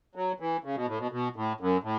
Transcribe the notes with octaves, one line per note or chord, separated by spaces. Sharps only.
F#3
E3
C#3
B2
A2
B2
B2
A2
F#2
A2